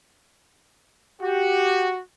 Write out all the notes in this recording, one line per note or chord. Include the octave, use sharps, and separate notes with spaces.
F#4 G4